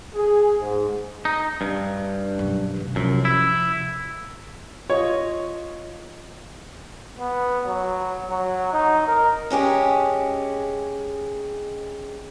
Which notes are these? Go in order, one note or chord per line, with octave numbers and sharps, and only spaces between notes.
G#4
G#2
D#4
G2
F#2 B2
B2 E3
F#2 C3 F3
E4
F4 C#5 D#5
B3
F#3
F#3
D#4
A#4
G#3 C#4 G4 G#4